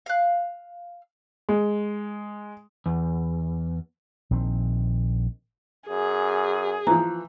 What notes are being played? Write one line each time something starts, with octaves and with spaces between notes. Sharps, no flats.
F5 F#6
G#3
E2
A#1 D#3 C4
F#2 G#4
E3 F3 A#5